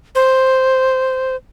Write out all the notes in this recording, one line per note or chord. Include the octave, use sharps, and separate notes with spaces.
C5